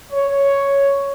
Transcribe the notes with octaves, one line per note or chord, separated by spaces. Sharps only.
C#5